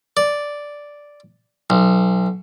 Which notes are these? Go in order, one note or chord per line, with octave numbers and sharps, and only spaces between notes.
D5
B1